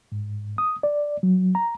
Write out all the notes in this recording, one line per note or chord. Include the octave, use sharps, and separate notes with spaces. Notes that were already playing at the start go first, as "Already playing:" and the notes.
G#2
D#6
D5
F#3
A#5